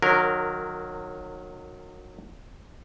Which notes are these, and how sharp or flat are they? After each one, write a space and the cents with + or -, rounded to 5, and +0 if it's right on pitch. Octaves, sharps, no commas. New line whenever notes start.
D#3 -35 F#3 -25 A#4 -10